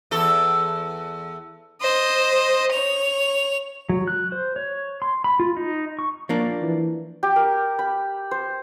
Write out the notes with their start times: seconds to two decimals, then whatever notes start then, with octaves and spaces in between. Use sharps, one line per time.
0.11 E2 A4
1.81 C5 D#5
2.72 C#5 F7
3.89 F#3
4.08 F#6
4.32 C5
4.56 C#5
5.02 C6
5.24 B5
5.40 F4
5.57 D#4
5.99 C#6
6.29 F3 A#3 D4
6.62 E3
7.23 G4
7.36 A#4
7.79 B5
8.31 C5